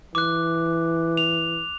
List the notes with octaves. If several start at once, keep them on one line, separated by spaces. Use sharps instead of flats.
E3 D6 F#6
F7